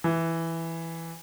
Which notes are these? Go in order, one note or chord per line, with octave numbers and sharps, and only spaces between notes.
E3